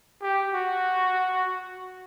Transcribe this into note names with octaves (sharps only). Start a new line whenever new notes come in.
G4
F#4